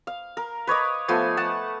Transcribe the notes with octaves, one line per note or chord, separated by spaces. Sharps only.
F5
A#4
B4 C#5 D#5 D6
F3 A3 B3 G#5
F#5 A5